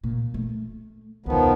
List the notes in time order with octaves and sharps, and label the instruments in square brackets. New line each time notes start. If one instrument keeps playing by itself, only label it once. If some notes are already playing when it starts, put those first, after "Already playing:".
[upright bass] A#2
A3
[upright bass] E1 C#2 [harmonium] D#3 F3 B3